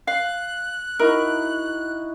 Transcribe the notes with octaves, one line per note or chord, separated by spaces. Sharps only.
F5 F#6
D#4 E4 F#4 A#4